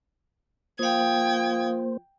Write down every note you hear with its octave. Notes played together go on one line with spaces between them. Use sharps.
F3 A#3 C5 F5 G5 D#6 G#6